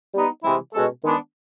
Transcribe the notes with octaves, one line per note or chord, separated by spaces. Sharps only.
G3 B3 D#4
C3 E3 G#3 C4 E4
B2 G#3 C#4 F#4 A4
D#3 G#3 B3 D4